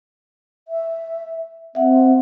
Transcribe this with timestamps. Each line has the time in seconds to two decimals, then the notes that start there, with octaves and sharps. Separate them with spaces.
0.68 E5
1.75 C4 E5 F#5